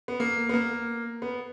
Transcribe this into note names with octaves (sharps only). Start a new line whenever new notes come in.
B3
A#3
B3
A#3
B3